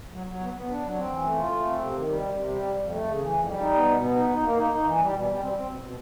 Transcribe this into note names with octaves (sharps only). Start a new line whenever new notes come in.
F#3
F#3
B3
B3
D4
F#3
C4
E3
A3
F4
A3
C4
C3
D#3
G3
C3
C3
G3
F2
F2
A3
C#3
E3
F2
G3
D#4
B3
B2
B3
D#4
D#4
A#3
D#4
D#4
E3
G3
B2
G3
C4
C4
B2
B2